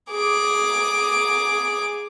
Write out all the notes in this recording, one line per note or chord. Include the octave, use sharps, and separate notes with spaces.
G#4 D6